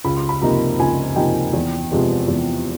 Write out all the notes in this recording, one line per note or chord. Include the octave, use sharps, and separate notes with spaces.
C#2 B5
C6
B5
C3 F3 A#3 D#4 A#5
C#2 G#5
C3 F3 A#3 D#4 G5
E2
C3 F3 G#3 B3
E2